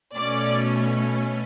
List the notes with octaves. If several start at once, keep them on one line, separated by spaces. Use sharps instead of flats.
B2 A3 C#4 D5